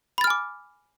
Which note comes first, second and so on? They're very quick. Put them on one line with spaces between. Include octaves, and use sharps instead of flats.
B5 A6 F6 G#5 D6